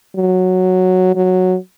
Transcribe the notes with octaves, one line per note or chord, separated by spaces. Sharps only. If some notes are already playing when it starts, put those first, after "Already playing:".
F#3
F#3